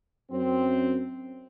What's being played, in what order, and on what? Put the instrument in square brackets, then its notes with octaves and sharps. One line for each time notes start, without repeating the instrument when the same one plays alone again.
[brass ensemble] F#2 C4